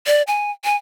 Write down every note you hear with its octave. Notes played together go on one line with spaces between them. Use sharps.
D5
G#5
G#5